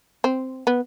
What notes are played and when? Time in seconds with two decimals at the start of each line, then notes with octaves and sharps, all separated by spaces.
0.24 C4
0.67 B3